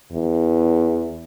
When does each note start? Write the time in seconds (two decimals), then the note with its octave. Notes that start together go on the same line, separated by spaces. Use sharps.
0.12 E2